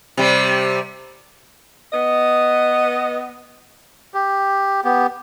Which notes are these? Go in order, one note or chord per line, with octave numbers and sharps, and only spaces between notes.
C3 G3
B3 D#5
G4
B3 G4